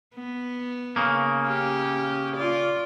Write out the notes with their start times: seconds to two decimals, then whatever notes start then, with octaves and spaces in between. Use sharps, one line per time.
0.15 B3
0.96 C#3 A#3
1.43 C#4 G4
2.36 F4 D5